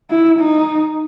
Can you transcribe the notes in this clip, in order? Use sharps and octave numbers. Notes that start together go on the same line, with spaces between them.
E4
D#4